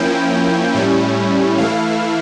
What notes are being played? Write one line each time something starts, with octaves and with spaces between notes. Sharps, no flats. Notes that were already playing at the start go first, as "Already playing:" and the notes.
Already playing: F3 A#3 C#4 E4 G5
A2 G3 C#4 E4
E3 A3 E4 F5